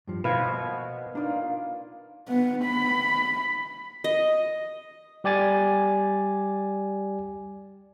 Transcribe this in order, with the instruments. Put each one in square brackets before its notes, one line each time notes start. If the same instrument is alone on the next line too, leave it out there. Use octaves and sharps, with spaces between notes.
[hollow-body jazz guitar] G2 F3
[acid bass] B2 [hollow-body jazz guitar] A#3 C5 [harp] B4 F5 G#6
[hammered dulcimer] A#3 F4 D#5 [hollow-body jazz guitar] D4 D#4 D5
[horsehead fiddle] B3
B5
[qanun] D#5
[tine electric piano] G3 G4 D5 G#5 A6